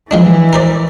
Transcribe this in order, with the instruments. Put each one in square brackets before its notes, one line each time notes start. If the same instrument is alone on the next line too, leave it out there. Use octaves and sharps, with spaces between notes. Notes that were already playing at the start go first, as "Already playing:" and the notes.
[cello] E3 [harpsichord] F3 G#3 D4
[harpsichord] A#4 C5 D5